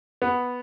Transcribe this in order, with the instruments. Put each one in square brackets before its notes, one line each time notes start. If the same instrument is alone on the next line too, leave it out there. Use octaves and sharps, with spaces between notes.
[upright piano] B3